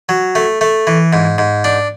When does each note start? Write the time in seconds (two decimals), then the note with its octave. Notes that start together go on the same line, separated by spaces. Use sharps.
0.09 F#3
0.35 A3
0.61 A3
0.87 E3
1.13 G#2
1.38 G#2
1.64 D4